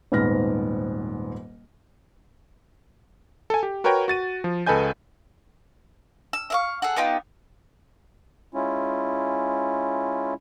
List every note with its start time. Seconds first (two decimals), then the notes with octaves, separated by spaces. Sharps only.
0.12 D#1 G#2 B3 F6 A#6
3.50 A4 G#5
3.63 G4
3.84 F#4 A#4 B4 C#5 G5
4.08 F#4 A6 D#7
4.44 F3
4.66 C#2 A4 B4 D#5 G#5 G6
6.33 E6
6.50 E5 F5 C#6
6.82 G#4 A4 F#5
6.96 B3 D#4 F4 G4
8.54 G#3 C#4 E4 F4